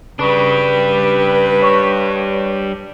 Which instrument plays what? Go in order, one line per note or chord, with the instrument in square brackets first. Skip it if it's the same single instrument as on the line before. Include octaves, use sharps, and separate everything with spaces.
[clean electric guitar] C#3 [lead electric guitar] G3 D4 [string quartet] B4
[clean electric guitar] C#5